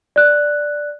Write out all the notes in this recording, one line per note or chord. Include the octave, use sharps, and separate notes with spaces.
D5 F#6